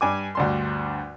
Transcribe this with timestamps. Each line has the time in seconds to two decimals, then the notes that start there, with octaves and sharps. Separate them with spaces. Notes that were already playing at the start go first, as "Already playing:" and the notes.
0.01 G2 G#5 D6
0.35 D2 G2 C6